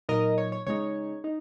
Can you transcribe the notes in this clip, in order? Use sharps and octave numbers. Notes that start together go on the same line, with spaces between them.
A#2 F#3 D#4 A#4 D#5
C#5
C#5
C#3 G#3 D#4 C#5
D#4